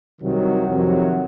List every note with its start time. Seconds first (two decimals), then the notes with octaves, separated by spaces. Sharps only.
0.20 C2 C3 D#3 F#3
0.68 F2 C3 D#3 F#3